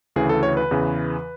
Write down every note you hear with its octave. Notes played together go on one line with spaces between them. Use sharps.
D2 C#3 E3 G#4
A4
C#5
B4
E2 C#3 E3